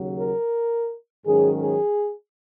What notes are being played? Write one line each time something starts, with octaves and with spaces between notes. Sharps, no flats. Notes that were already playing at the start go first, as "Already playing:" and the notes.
Already playing: D#2 C#3 F#3
A#4
G#2 D#3 F#3 C#4 G#4
G#4